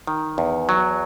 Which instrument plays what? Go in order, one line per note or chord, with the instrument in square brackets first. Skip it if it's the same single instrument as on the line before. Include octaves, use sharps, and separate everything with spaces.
[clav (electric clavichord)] D#3
E2
F#3